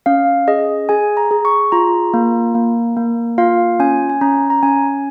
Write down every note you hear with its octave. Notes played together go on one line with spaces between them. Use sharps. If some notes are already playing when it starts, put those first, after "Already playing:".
C#4 F5
G#4 D#5
G#4 G#5
A#5
G#4
C#6
F4 A#5
A#3
A#3
A#3
F4 F5
C#4 G#5
G#5
C#4 A#5
A#5
C#4 G#5